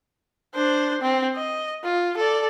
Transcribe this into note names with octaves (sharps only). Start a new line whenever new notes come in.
D4 C5
C4
D#5
F4
A4 D5